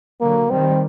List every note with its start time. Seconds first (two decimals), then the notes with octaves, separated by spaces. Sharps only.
0.21 D3 F#3 A#3
0.51 D#3 G3 C4